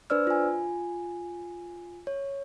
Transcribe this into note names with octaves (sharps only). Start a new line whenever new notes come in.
D4 B4 C5 D5 E6 F6
F4 G#5
C#5